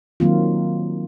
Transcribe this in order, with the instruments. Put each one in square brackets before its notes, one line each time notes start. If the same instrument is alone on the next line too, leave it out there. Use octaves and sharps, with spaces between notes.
[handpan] D#3 F#3 A#3 C4 F4